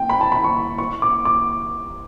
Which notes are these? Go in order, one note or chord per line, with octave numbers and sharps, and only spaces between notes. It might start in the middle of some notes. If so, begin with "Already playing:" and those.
Already playing: G5
B5
A5
B5
C#6
C#6
D6
D6